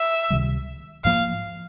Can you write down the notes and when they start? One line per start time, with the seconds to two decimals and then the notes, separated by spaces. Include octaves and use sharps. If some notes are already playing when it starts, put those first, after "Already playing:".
Already playing: E5
0.30 C#2 C3 D#3 G3
1.05 G#2 F3 A#3 F5